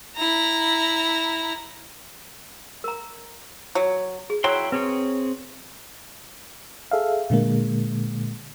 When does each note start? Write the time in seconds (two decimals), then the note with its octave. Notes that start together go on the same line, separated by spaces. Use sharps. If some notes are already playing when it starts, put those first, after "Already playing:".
0.16 E4 A#5
2.84 A#4 A#5
3.75 F#3
4.30 G#4
4.44 F#3 E4 C#5 G5 C6
4.72 C4 G#4 B4 C#5
6.91 G#4 A4 E5 F5
7.30 A#2 D3 G#3 A#3